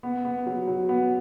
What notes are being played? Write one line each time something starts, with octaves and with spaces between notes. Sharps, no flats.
B3
B3
F#3
F#3
B3